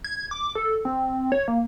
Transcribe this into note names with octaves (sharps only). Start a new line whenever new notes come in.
G#6
D6
A4
C4
C#5
A#3